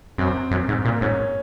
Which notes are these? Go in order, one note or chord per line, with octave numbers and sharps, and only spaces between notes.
F#2 C4
F#2
G#2
A#2 A#3
G#2 C#4